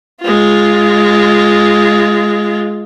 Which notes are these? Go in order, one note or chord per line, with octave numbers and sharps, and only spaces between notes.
G#3 F4